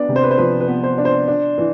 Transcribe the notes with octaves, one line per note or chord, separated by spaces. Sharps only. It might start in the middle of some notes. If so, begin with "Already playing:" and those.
Already playing: B3 D4 D5
C3
C5
B4
C5
F3 B4
B4
B3
C5
D4
C5
D4
E3